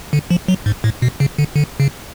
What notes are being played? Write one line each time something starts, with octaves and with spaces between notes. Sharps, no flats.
D3
F3
F#3
G#2
A2
B2
C#3
D3
D3
C#3